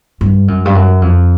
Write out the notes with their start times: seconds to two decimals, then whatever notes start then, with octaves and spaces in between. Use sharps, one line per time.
0.21 G2
0.48 F#2
0.65 G2
0.75 F#2
1.02 F2